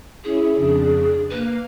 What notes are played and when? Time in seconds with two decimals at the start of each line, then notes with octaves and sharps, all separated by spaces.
0.24 C#4 E4 G#4
0.54 F2 C#3 D4
1.30 A#3 B4 F5